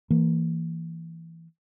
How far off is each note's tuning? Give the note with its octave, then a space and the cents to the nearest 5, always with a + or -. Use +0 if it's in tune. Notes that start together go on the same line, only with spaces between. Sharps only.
E3 +0 A#3 -20